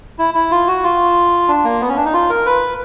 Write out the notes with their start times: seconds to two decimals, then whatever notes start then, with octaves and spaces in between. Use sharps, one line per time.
0.19 E4
0.34 E4
0.51 F4
0.67 F#4
0.84 F4
1.48 D4
1.64 A#3
1.81 B3
1.88 C#4
1.96 D4
2.05 D#4
2.13 F4
2.30 A#4
2.46 B4